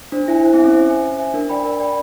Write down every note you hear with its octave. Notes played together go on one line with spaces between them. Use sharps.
D4 C5
E4 E5 G#5
E4 C5
C4
E5 G#5
C#4
C5
E5 G#5
C5
E5 G#5
D4 A#4
D5 G5 B5
A#4
D5 G5 B5